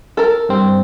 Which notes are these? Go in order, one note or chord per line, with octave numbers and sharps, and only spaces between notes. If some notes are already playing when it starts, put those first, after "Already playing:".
A4 A#4
G2 C4